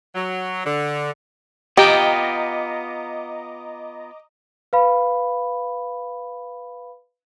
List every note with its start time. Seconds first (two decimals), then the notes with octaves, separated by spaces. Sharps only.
0.15 F#3
0.65 D3
1.77 B3 F4 G4 D#5 G5 A#5 D6
4.73 B4 F5 B5